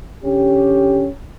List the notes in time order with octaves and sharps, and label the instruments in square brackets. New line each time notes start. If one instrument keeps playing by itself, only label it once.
[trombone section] D3 C#4 G4